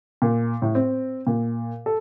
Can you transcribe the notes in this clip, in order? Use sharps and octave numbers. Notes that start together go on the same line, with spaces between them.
A#2
A2
C4
A#2
A4